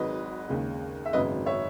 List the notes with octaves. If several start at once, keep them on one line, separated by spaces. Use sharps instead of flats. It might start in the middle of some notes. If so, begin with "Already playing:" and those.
Already playing: G#1 G#2 D#3 F#3 B4 D#5
D#2 C#3 G#3
E5
G#1 F#2 C#3 F#3 B3 B4 D#5
C#5 E5